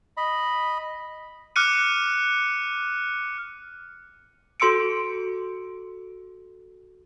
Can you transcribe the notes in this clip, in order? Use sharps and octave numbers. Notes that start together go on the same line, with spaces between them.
D#5 B5
D6 F6 F#6 C#7 D#7
F#4 A4 C6 E6 C#7 D7